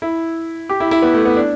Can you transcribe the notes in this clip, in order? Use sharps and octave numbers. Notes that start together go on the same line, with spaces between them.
E4
G4
E4
E4
B3
A3
B3
D4